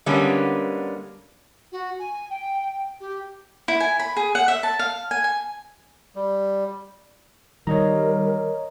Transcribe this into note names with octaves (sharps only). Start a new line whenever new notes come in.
D3 G3 G#3 A#3 B3 C#4
F#4
G#5
G5
G4
E4
G#5
B5
G#4
F#5
E5
A5
F5
G#5
G#5
G3
D#3 G3 A#4 C#5 D#5 A#5